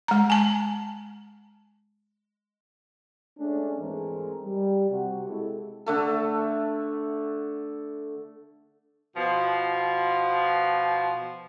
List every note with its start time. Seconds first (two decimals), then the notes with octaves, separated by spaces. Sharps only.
0.08 G#3 A#5
0.30 G#5 A5
3.38 G#3 A3 C#4 D4
3.77 G#1 E3 G#3 A3 C4 A#4
4.42 G3
4.90 C3 F#4
5.28 G#3 E4 A4
5.86 D3 A3 A4
9.16 B2 F3